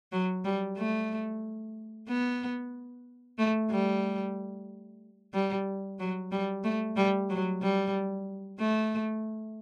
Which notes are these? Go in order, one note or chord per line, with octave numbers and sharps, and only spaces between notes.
F#3
G3
A3
B3
A3
G3
G3
F#3
G3
A3
G3
F#3
G3
A3